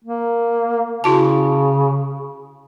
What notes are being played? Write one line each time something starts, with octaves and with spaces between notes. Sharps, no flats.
A#3
C#3 E4 F#4 A5